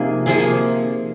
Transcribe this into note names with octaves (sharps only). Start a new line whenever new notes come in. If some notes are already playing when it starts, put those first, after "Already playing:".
Already playing: C3 F3 A#3 D#4 G#4
C3 F3 A#3 G#4